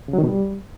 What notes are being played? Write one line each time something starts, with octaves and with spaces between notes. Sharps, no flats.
C#3
F#3
D#3
B2
G3